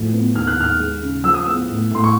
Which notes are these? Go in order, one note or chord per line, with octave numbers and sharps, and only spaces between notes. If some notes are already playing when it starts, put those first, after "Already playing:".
Already playing: A2 F3
B3
D#2 F6
F#6
D#2 F6
G#3
C#3
F3 E6
D#6
B3 E6
A2
A2 C6
C#6